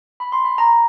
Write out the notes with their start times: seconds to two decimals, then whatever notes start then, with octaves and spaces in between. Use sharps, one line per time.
0.20 B5
0.32 C6
0.45 B5
0.58 A#5